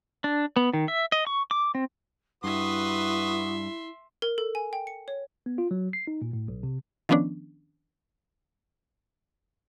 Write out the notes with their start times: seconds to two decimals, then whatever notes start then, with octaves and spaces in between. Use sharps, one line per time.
0.24 D4
0.56 B3
0.73 D#3
0.88 E5
1.12 D#5
1.27 C#6
1.51 D6
1.75 C4
2.44 G2 E4 F#4 B4 E5 C6 D#6
4.22 A#4
4.38 A4
4.55 G#5
4.73 G5
4.87 C#7
5.08 C#5
5.46 B3
5.58 F4
5.71 F#3
5.93 C7
6.07 D#4
6.22 A#2
6.33 A2
6.48 B1
6.63 C3
7.09 D#3 F3 B3 C#4 D4